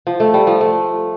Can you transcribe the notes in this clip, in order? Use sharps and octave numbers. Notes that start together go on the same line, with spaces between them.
F3
A3
G3
F3
A3